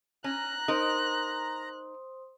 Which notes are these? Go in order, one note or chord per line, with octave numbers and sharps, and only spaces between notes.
C#4 A#5 F#6
D#4 A#4 C5 C6 D#6